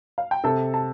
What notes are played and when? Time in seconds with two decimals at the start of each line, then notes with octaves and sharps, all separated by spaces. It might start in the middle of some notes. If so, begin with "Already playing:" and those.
0.18 F5
0.31 G5
0.44 C3 A4 A5
0.74 A5